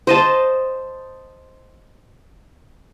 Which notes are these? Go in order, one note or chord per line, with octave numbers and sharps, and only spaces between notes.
C5 D#5 A5